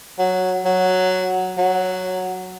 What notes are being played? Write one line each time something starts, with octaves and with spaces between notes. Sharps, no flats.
F#3
F#3
F#3